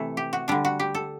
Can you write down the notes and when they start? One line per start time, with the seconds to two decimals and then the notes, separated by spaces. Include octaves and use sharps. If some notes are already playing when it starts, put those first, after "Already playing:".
Already playing: C3 E3 A3 A4
0.17 G4
0.33 F#4
0.48 D3 G3 D4
0.65 F#4
0.80 G4
0.95 A4